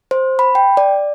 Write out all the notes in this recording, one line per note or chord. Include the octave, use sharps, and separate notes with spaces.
C5
B5
G5
D5